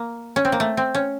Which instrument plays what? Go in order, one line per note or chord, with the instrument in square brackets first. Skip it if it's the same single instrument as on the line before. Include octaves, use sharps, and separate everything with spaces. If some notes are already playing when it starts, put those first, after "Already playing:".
Already playing: [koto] A#3
C#4
C4
A#3
A3
C4
C#4